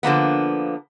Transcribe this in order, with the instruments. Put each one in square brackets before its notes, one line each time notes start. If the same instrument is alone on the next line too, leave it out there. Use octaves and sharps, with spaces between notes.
[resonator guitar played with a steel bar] D3 F3 A#3 B3